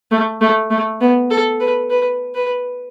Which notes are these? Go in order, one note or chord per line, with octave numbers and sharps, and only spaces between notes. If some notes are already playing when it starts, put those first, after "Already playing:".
A3
A3
A3
B3
A4
B4
B4
B4